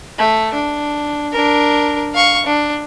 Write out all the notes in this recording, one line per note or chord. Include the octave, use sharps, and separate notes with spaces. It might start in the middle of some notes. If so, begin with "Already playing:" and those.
A3
D4
D4 A#4
F5 C#6
D4